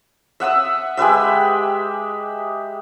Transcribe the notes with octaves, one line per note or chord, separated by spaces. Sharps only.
E5 F#5 D#6 E6
G#3 G4 B4 E5